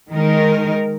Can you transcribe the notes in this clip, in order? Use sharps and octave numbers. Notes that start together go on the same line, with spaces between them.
D#3 G#3 D#4 A#4